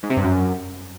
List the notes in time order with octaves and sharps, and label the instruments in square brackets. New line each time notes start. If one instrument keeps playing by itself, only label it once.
[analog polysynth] G#2
C3
G2
F#2